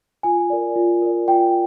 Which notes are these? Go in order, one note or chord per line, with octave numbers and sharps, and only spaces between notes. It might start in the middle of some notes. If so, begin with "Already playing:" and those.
F4 G#5
A#4 D5
F4
A#4 D5
F4 G5